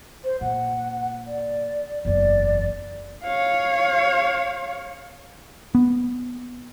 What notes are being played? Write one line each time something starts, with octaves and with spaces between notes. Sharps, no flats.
C5
A#2 F#5
D5
F#1 E2 D5
C#5 F5
B3